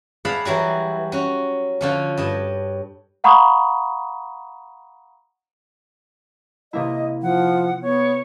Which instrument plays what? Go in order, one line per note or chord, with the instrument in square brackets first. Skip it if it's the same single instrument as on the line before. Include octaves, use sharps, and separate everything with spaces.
[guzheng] G#4 D5 F5 F#5 A5 B5
E3 F#3 G3 F#4
C#4 F#4
D3 F3 C#4
G2 D#5 A5
[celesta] F5 F#5 A#5 B5 C#6 D#6
[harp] C3 A#3 E4 [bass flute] D#5
[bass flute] F3 [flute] F#5
[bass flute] B3 [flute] C#5